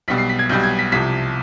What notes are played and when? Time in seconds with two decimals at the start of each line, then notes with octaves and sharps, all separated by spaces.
0.08 B1 B2 G3 B6
0.18 C7
0.29 B6
0.39 G#6
0.49 B1 B2 G3 G6
0.64 G#6
0.79 B6
0.92 C2 C3 F3 B6